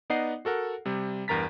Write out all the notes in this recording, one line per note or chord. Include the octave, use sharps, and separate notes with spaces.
B3 D#4 D5 D#5 F#5 C7
F#4 A4 A#4 F#5
C3 G3
E2 G2 A#4 A#5 A6 B6